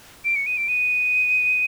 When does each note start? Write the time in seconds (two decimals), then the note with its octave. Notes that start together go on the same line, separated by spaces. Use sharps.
0.25 D7
0.36 C#7
0.46 D#7
0.57 D7
0.68 D#7